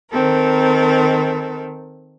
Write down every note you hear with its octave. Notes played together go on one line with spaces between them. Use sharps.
D#3 C4 A4 A#4